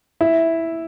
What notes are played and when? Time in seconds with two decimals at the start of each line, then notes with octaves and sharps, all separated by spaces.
0.21 E4 E5